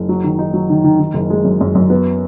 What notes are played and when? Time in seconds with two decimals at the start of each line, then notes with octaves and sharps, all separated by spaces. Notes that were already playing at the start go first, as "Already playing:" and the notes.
Already playing: F#1
0.09 F#3
0.24 D#3
0.39 D#4
0.54 F#3
0.70 D#3
0.84 D#3
1.00 D#3
1.14 F#1
1.30 G#3
1.45 F#2
1.61 F#2
1.75 F#2
1.90 B3